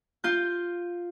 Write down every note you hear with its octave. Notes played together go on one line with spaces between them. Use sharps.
F4 G6